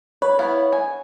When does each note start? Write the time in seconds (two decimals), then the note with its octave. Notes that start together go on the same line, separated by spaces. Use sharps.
0.22 B4 C#5
0.39 B3 E4 F5
0.73 G#5